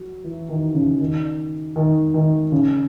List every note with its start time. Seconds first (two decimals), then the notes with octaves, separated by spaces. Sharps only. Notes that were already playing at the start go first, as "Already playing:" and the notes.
Already playing: F#3
0.24 E3
0.49 D#3
0.75 C#3
0.99 D#3
1.76 D#3
2.14 D#3
2.52 C#3